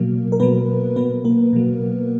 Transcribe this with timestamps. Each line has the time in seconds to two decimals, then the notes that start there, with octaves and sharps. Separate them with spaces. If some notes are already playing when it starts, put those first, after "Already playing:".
Already playing: B2 F#3 A#3 A#4
0.32 A#4
0.40 B2 F#3 B3 B4
0.96 B2 F#3 B3 B4
1.25 A#3 A#4
1.53 B2 F#3